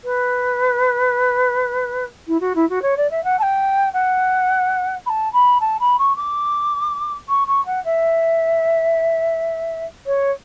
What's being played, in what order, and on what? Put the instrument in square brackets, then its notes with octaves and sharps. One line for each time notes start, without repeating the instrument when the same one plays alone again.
[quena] B4
E4
F#4
E4
F#4
C#5
D5
E5
F#5
A5
G5
F#5
B5
A5
B5
A5
B5
C#6
D6
C#6
C#6
F#5
E5
C#5